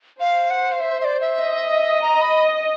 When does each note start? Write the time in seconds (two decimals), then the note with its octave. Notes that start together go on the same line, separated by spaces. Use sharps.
0.20 C5 F5
0.50 F#5
0.72 F5
0.80 E5
1.01 E5
1.05 D5
1.21 E5
1.41 D#5
2.02 A#5
2.21 B5